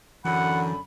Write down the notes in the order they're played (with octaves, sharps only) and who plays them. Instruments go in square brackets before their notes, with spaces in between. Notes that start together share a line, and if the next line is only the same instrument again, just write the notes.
[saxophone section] F#2 D3 [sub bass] E3 [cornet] F#5 [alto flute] B5